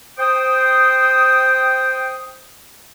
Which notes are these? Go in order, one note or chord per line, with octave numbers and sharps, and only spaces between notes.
C5 G5 D#6